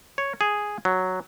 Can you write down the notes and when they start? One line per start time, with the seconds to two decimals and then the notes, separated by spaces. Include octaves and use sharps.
0.18 C#5
0.41 G#4
0.85 F#3